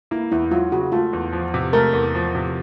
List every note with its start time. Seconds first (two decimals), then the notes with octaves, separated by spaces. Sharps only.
0.11 A#3 E4
0.32 E2 E4
0.51 F#3 F4
0.72 C#3 F#4
0.92 A3 F4
1.13 E2
1.33 F3
1.54 C3
1.73 A3 A#4
1.93 E2
2.15 F3
2.35 C3